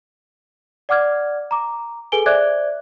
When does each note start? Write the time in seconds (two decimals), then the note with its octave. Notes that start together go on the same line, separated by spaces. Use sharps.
0.89 D5 F#5 D6 F6 G#6
1.51 A#5 D6
2.12 G#4 A4 B4 G#5 D7 G7
2.26 C5 D5 E5 D6 F#6 G#6